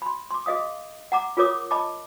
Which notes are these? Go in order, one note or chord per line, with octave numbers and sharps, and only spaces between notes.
B5 C6
C6 D6
G#4 D#5 F5 D#6
F#5 A#5 D6
F4 G#4 A#4 C#5 D6 D#6
D#5 A5 B5 D6